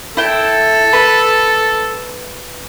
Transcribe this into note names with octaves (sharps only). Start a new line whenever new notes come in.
E4 A4 G5
B4 B5